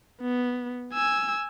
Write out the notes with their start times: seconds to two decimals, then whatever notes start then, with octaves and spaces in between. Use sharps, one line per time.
0.22 B3
0.93 G#5 E6